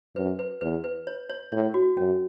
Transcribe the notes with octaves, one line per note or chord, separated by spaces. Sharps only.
F#2 B4
B4
E2 B4
B4
C#5
C#5
A2 C#5
F#4
F#2 C#4